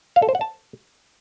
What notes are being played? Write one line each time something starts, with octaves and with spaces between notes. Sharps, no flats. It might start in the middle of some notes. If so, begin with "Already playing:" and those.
F5
A4
C5
F#5
A5